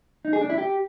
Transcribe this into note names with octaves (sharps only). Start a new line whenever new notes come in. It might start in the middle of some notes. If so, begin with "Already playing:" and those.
D#4
G#4
D4
E4
G4